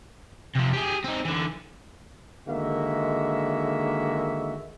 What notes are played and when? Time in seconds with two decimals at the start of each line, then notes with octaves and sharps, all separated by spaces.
0.55 C3 F3
0.73 G4 G#4
1.04 C4 D#4
1.25 D3 E3
2.48 D3 D#3 G#3 A#3 F#4 E5